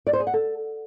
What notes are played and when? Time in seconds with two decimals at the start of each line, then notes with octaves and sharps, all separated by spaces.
0.07 D5
0.13 C5
0.20 G#4
0.27 F#5
0.34 A4